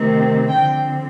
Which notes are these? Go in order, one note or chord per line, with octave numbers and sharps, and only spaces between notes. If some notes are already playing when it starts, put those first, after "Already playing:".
Already playing: C3 D#3 A3 C4
D3 F3 C4 G5